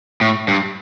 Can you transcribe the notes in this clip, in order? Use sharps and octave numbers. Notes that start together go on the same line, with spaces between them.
A2
G2